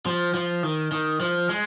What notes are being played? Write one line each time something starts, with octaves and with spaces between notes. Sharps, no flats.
F3
F3
D#3
D#3
F3
G#3